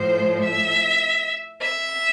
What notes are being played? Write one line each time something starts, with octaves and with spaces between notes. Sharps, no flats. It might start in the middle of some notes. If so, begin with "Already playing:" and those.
Already playing: A2 F3 C5
E5
E5